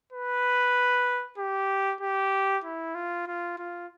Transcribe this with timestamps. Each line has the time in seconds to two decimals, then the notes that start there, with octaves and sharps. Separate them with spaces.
0.12 B4
1.38 G4
2.01 G4
2.64 E4
2.95 F4
3.27 F4
3.58 F4